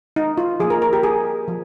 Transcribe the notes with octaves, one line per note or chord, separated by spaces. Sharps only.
D#4
F4
F3 A#3 G#4
A#4
A#4
G4
G#4
F3